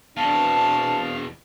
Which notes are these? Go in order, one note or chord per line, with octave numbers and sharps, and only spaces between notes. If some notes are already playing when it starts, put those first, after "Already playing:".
E2 B2 E3 C4 D4 F5 A5